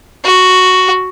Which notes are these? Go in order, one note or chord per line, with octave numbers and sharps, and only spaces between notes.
F#4